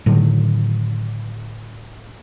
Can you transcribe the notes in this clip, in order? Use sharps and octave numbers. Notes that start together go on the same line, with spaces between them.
A2 D3 D#3 F#3